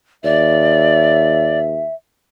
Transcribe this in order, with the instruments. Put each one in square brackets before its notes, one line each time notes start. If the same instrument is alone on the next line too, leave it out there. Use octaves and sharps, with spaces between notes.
[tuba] D#2 [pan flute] D5 [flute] E5